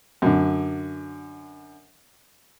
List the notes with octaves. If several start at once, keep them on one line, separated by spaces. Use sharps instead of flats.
F#2 D3